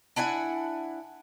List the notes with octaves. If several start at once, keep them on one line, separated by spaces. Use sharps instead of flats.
D4 E4 F#5 G#5